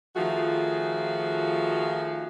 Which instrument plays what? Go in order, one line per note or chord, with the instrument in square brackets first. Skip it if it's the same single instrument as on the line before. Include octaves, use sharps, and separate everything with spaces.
[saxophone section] D#3 F3 A3 F4 F#4 G#4